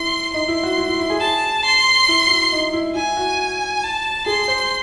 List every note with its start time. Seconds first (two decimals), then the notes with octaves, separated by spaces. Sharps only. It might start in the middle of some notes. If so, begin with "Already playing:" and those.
Already playing: E4 C6
0.34 D#4 C6
0.48 E4
0.63 F#4
0.78 E4
0.89 E4
1.00 E4
1.10 G#4
1.20 A5
1.65 C6
2.08 E4
2.25 F#4
2.29 E4
2.52 D#4
2.73 E4
2.95 E4 G#5
3.17 F#4
3.83 A5
4.26 G#4 C6
4.48 C5